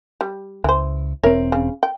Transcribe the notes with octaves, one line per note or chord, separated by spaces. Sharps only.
G3
C#2 E3 C5
E1 C4 E4 A#4 C#5
C#3
G5